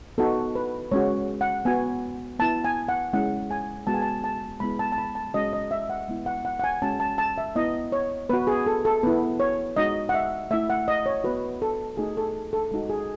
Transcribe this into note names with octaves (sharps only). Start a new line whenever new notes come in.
B3 D#4 F#4 A4
B4
G#3 C#4 F#4 C#5
F#5
B3 F#4 G#5
B3 E4 A5
G#5
F#5
G#3 C#4 E4 F#5
G#5
G#3 B3 F#4 A5
G#5
A5
A5
G#3 B3 E4 B5
A5
A5
B5
A5
G#3 C#4 F#4 D#5
D#5
E5
F#5
G#3 B3 E4
F#5
F#5
F#5
G#5
G#3 C#4 F#4 A5
A5
A5
E5
B3 E4 D#5
C#5
B3 F#4 B4
G#4
A4
A4
B3 E4 B4
C#5
G#3 D#4 F#4 D#5
F#5
E5
A3 E4 E5
F#5
D#5
C#5
B3 F#4 B4
A4
A3 D#4 F#4 G#4
A4
A4
G#3 D#4 F#4 A4
G#4